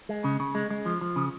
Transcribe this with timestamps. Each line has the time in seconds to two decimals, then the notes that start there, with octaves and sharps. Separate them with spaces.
0.09 G#3
0.24 C#3
0.40 C#3
0.55 G#3
0.70 G#3
0.86 F3
1.01 F3
1.16 C#3